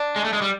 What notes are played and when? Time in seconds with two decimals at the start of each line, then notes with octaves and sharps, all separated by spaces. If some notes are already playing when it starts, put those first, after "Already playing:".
Already playing: D4
0.16 G#3
0.24 A3
0.33 G#3
0.42 G3